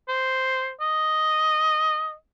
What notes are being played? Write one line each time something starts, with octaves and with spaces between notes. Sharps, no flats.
C5
D#5